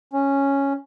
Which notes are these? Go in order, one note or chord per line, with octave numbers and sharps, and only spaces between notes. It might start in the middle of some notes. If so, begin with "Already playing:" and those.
C#4